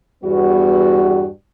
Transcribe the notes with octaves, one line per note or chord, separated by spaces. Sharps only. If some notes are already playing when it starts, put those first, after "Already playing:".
E2 G2 G3 B3 F#4